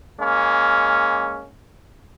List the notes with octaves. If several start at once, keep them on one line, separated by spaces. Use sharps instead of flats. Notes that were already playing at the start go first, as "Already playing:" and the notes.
G#3 A#3 C#4